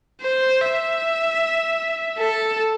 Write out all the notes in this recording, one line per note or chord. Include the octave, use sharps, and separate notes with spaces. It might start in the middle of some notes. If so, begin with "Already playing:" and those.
C5
E5
A4